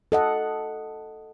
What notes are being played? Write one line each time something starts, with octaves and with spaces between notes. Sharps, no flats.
A4 D#5 F#5